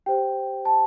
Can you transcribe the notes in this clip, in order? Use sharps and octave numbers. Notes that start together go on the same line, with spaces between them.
G4 C5 G5
A5